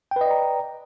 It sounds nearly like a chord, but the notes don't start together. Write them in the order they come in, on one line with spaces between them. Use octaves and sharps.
G5 B4 D#5 D5 A#5